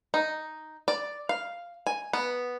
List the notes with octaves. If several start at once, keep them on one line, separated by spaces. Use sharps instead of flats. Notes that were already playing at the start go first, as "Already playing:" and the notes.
D#4
D5
F5
G#5
B3